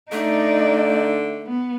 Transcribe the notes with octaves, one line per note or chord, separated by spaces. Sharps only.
D3 A3 D#4 D5
B3